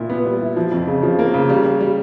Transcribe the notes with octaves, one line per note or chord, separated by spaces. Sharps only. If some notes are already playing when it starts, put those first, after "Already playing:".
Already playing: A#2 E4
B3
G3
E4
F3
F2
C#3
F3
A#3
C#3
G3
G3
G3